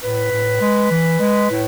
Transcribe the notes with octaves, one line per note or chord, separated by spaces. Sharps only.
A2 B4
A2
G#3
E3
G#3
A2